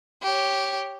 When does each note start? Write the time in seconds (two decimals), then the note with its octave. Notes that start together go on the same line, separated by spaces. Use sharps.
0.23 G4 C#5